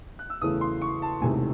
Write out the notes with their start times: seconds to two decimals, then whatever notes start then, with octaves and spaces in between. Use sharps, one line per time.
0.19 F#6
0.30 E6
0.41 E2 C#3 E3 A3 D#6
0.61 C6
0.82 C#6
1.02 A5
1.22 E1 E2 C3 D#3 A3 G#5